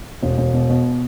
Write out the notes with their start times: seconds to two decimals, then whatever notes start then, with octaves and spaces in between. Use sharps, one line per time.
0.22 E1
0.38 E1
0.53 B2
0.70 B2